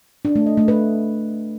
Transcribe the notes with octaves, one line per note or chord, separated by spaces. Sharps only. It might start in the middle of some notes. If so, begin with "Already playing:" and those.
D4
A3
D#5
A3
B4